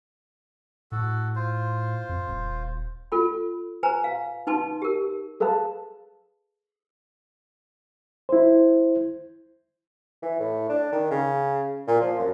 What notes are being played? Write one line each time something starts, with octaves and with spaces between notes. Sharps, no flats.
A2 F#4 A4
F4 C5
F2
D#1
F4 A4 B5
B4 C5 G#5 A#5 C6
F5
D#4 B4 A5 C6
G4 A#4
G#4 A4 B4 F5 A5
E4 C5
E3
A2
D4
D#3
C#3
A#2
F3
F#2